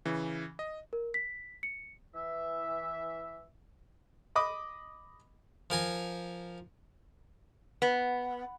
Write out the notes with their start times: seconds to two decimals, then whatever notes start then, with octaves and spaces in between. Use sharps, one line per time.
0.06 C#3 E3
0.59 D#5
0.93 A#4
1.14 B6
1.63 C#7
2.15 E3 E5
4.35 D#5 B5 D6 D#6
5.70 F3 A#4 G#5 A#5
7.82 B3